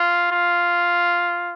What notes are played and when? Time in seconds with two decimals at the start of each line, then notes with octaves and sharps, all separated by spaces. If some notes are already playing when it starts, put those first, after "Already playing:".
Already playing: F4
0.31 F4